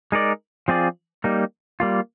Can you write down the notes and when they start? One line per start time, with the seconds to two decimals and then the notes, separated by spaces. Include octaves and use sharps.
0.12 G#3 D#4 A#4 D5
0.68 F3 C4 F4 G#4 D5
1.24 G3 A#3 D#4
1.80 G3 A#3 F4